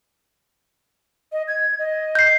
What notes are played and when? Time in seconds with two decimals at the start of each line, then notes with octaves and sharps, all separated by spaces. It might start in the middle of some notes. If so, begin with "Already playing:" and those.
1.32 D#5
1.48 G#6
1.79 D#5
2.15 G6 C7